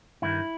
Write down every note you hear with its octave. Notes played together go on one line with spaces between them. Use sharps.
G2 D#3 E4